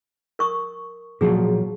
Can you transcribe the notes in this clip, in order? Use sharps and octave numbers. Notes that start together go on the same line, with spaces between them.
A#4 C#6 D#6
A#2 F3 F#3 G#4